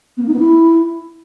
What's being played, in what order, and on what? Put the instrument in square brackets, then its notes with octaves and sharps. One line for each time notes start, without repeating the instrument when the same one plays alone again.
[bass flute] B3
A#3
D#4
B3
E4